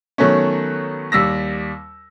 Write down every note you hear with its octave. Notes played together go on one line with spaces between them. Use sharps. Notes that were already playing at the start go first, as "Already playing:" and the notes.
D#3 F#3 A3 B3 C#4
D#2 G3 E6 A#6